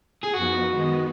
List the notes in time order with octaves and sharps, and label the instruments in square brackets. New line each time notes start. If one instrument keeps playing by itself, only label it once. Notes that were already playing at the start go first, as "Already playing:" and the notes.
[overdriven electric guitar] G#4
[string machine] F#2 F3 B3 D#4 [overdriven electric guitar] F#4
[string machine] D#3 G#3 B3 D#4